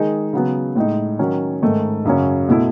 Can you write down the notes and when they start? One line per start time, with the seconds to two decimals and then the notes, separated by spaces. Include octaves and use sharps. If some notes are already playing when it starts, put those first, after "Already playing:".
Already playing: D#3 G#3 D#4 G#4
0.33 C#3 F#3 B3
0.76 A2 G#3 D#4
1.19 D#3 F#3 C#4
1.62 G#2 D#3 A3
2.05 F#2 C#3 F#3 C#4
2.49 B2 A3 E4